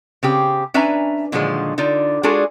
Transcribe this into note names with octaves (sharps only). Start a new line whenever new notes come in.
C#3 C4 G4
C#4 D4 B4 E5 G#5 A#5
A#2 D3 D#3 F3 F#3 G#3
D3 D#4 F4 D5
G#3 D4 F4 F#4 G#4 A4